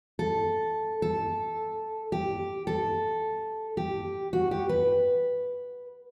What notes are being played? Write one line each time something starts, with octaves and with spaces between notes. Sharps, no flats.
A4
A4
G4
A4
G4
F#4
G4
B4